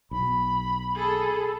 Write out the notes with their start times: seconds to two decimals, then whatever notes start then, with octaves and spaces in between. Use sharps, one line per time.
0.11 B1 B5
0.96 G#4 A4